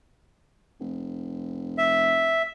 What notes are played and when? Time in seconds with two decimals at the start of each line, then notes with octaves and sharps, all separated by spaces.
0.80 F1
1.78 E5